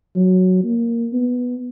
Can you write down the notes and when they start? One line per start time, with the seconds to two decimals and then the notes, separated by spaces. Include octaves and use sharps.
0.16 F#3
0.64 A#3
1.13 B3